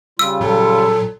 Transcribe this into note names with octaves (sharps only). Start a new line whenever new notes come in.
C#3 G3 F4 E6
A#2 F#3 A4